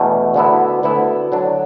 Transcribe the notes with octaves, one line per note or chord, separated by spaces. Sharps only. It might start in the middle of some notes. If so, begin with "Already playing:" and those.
Already playing: E2 B2 A3 D4
D2 D3 B3 E4
D2 D3 B3 E4
D3 F#3 D4